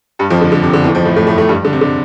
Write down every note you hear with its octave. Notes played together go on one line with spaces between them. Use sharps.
G2 G3
F2 F3
D3
D3
C3
D3
E2 E3
F2 F3
A2 A3
A2 A3
A2 A3
A2 A3
G2 G3
D3
C3
D3